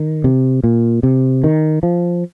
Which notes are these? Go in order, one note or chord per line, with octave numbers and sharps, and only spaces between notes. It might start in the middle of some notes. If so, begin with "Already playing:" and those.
Already playing: D#3
C3
A#2
C3
D#3
F3